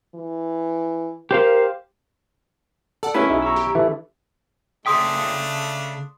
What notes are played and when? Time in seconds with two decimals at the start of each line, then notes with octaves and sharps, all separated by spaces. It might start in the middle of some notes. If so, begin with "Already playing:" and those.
0.15 E3
1.31 G4 A#4 C5 F5
3.03 A4 D5 F#5
3.14 C#4 E4 B4 G#6
3.30 B1 D#4 G#4 E5
3.42 A#5 C#6 E6
3.56 G4
3.75 E3 E4 A4 E5
4.86 C#3 A3 D4 G#4 G5 C6 D#6 B6